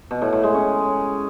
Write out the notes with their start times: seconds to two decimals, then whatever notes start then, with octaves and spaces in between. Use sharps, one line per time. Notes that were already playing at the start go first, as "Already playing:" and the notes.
0.11 B2
0.22 A2
0.33 A2
0.43 G#3
0.54 C#4